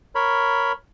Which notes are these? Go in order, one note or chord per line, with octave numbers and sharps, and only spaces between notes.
A#4 C#5 B5